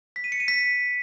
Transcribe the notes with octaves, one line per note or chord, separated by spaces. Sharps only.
B6
D#7
C#7
D#7
B6